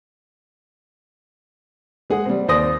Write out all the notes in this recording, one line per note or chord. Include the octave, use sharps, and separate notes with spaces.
G#3 G#4 F#5
G3 C4
D#2 C5 D5 D#6 A#6